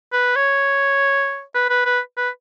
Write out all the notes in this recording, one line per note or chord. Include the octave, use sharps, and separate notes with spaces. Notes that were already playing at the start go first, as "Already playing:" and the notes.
B4
C#5
B4
B4
B4
B4